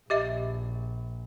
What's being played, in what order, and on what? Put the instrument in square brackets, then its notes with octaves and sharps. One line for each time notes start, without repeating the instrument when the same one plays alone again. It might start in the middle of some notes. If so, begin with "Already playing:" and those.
[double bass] A#1 [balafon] G4 D#5 E5